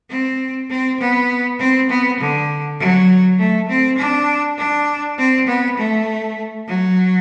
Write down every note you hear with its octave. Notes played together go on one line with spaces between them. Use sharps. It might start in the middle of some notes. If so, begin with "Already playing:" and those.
C4
C4
B3
C4
B3
D3
F#3
A3
C4
D4
D4
C4
B3
A3
F#3